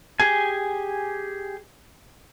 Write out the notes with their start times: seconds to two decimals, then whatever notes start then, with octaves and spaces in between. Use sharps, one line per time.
0.20 G4 G#4 G#5